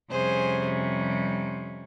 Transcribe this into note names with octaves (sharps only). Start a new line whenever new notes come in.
F2 C3 G3 C#4 G#4 C5